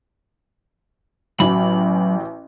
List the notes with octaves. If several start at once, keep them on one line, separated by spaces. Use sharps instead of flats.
A1 F#3 F#4 G#5 B5